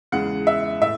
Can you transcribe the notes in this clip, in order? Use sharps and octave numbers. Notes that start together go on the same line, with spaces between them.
E2 C#3 G#3 F#5
E5
A2 E5